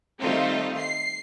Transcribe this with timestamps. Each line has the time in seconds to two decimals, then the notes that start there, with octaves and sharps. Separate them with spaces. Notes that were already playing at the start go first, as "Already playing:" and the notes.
0.21 D#3 G3 A3 C4 D#4 F4
0.78 C7